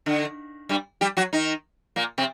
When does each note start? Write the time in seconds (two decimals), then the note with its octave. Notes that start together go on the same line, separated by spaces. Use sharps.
0.06 D3
0.69 G2 G3
1.01 G3 G4
1.17 F#3 F#4
1.33 D#3 D#4
1.96 A#2 A#3
2.18 C3 C4